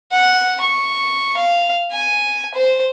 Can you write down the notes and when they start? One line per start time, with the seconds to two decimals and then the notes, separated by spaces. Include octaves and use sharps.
0.13 F#5
0.62 C#6
1.38 F5
1.92 G#5
2.55 C5